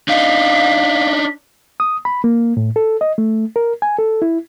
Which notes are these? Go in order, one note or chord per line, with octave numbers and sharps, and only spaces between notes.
D4 D#4 F5 B6
D#6
B5
A#3
A2
A4
D#5
A3
A#4
G#5
A4
E4